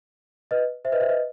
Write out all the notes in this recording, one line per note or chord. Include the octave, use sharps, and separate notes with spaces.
B4 D#5
C5 E5
B4 D#5
C5 E5
B4 D#5